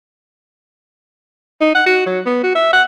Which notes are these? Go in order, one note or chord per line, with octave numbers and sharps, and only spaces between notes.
D#4
F#5
F#4
F#3
B3
F#4
E5
F#5